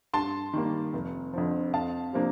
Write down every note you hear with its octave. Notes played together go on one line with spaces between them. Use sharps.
G2 A5 C6
D#3 G3 A#3
F1
F2 D3 F3
F2 F5 A5
C3 F3 A#3 D4